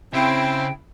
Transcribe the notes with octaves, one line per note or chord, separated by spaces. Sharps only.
C#3 C4 E4 G5